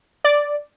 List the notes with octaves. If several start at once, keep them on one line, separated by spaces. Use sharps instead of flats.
D5